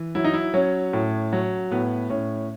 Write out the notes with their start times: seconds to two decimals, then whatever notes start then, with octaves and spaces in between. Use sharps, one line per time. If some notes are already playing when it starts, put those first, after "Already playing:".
Already playing: E3
0.15 F#3 E4
0.24 D#4
0.34 E4
0.54 F#3 C#4
0.93 A2
1.33 F#3
1.71 A2 B3
2.10 A2 C#4